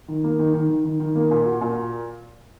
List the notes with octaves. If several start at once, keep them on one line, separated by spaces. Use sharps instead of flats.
D#3
A#3
D#3
D#3
D#3
D#3
D#3
A#3
A#2
F#4
A#2